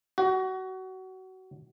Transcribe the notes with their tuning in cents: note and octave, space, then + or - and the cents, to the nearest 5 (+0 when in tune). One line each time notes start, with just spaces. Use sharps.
F#4 +25